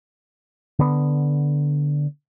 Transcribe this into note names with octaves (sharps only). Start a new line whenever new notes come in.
D3 B3